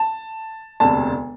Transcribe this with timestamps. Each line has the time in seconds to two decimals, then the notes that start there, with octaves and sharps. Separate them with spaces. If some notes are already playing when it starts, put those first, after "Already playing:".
Already playing: A5
0.80 E1 D2 C3 A5